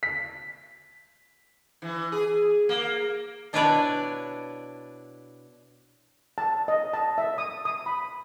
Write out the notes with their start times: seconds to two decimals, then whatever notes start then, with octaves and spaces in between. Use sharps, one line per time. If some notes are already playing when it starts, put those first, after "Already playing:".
0.03 B6
1.82 E3
2.12 G#4
2.69 A#3
3.53 B2 D4 E4 B4 C#5 D5
6.38 A5
6.68 D#5
6.94 A5
7.18 E5
7.38 D#6
7.65 D#6
7.86 B5